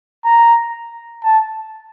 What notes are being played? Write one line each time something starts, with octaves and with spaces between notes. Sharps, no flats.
A#5
A5